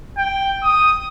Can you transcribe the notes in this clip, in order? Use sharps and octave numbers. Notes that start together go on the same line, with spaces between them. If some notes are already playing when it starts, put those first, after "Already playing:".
G5
D#6